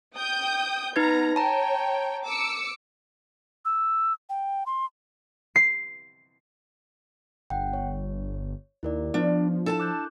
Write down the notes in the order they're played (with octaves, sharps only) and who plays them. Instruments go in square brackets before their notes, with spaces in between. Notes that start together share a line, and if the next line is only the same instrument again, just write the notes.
[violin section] G5 D#6 G6
[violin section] B3 A#5 [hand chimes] D#4 B4 G#6
[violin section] C#5 G5 [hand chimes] A5 A#5
[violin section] D6 E6 C#7
[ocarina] E6
G5
C6
[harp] C7
[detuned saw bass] G1 [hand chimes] F#5 G5
[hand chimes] C#5
[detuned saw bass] D#2 [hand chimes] E4 A#4 D5
[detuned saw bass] F3 [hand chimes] B3 [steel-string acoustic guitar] D4
[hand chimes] D4 E4 [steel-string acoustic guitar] A4 G#5 A5
[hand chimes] D6 F#6 G6